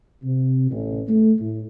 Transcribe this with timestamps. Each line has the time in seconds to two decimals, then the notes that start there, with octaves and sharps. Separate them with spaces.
0.22 C3
0.69 A1
1.07 A3
1.39 A2